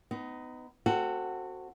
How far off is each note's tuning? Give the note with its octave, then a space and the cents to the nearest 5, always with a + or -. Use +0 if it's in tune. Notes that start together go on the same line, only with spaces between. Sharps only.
B3 +30 D#4 +0
C4 +5 F#4 +0 A4 +30